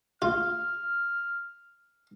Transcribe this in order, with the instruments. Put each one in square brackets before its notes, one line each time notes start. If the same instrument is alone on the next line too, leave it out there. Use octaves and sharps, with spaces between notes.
[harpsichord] F4 [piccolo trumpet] F6